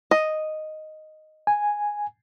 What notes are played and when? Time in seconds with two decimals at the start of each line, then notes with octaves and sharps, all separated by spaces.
0.11 D#5
1.47 G#5